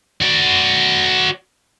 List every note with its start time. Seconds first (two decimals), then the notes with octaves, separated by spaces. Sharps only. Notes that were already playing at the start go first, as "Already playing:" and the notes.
0.22 F#4 D5